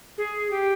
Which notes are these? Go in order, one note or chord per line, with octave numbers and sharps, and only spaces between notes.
G#4
G4